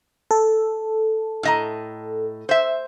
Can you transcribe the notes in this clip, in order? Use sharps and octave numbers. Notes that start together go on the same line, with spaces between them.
A4
A2 D#5 A#5
C5 E5